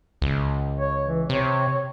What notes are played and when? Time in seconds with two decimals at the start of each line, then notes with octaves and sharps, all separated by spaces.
0.22 C#2
0.78 C#5
1.07 E3
1.29 C3 C#5